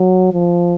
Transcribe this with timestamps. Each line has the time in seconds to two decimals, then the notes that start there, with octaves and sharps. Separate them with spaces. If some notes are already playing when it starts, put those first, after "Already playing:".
Already playing: F#3
0.32 F3